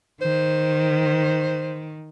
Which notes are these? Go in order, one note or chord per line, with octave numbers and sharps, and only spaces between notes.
D#3 C5